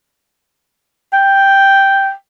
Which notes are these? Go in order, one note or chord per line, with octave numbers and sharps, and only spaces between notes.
G5